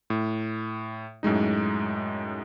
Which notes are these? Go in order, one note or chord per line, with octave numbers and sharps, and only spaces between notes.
A2
F#2 A2 G#3 D#4